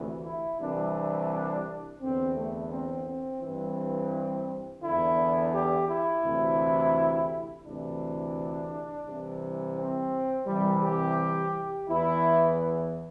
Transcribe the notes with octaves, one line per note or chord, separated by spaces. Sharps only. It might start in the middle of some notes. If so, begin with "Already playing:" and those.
Already playing: D2 C3 E3
E4
C2 C3 E3 D4
E2 D3 C4
A3
C4
C4
G2 E3 C4
E2 D3 E4
G4
E4
D2 C3 E3
D2 C3 E3 D4
C2 C3 E3
C4
C2 C3 E3 G3
G4
E2 E3 E4